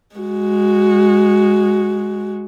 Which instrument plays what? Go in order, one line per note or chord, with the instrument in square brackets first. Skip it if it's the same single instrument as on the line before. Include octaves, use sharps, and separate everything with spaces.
[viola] G#3 F#4